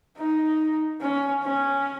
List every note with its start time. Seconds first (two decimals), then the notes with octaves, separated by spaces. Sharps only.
0.17 D#4
1.01 C#4
1.43 C#4